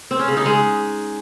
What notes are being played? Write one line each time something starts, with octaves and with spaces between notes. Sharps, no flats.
C4
C#4
C#3
D#4
G#3